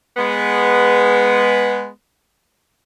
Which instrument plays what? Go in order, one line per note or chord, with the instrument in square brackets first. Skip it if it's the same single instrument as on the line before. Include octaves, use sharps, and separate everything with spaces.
[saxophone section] G#3 B3